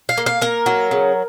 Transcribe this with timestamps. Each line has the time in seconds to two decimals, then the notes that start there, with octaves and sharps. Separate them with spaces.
0.09 F5
0.18 A#3
0.26 F5
0.41 A#3 A#4
0.66 F#3
0.91 C#3